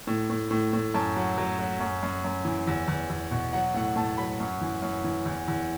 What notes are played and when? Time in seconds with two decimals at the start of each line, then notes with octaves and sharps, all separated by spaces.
0.07 A2
0.30 A2
0.51 A2
0.73 A2
0.94 F#2 A5
1.16 F#3
1.38 F#3
1.59 F#3
1.80 F#2
2.03 F#2
2.24 F#2
2.45 E3
2.68 E2
2.88 E2
3.10 E2
3.31 B2
3.53 F#3 F#5
3.74 A2 F#5
3.96 A2 A5
4.18 F#3 B5
4.40 F#2
4.61 E3
4.82 F#2
5.04 E3
5.26 E2
5.48 E2